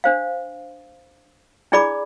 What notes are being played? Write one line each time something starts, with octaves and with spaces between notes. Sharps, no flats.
D4 C5 F5
D4 E4 G#4 D5 B5 D6